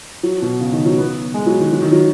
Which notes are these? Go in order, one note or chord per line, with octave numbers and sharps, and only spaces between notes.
F#3
B2
C#3
D#3
F#3
B3
G#3
F#3
D#3
F#3
D#3
F#3